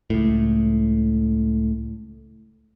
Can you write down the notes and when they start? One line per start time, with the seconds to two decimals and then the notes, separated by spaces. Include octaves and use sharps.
0.10 C#2 A2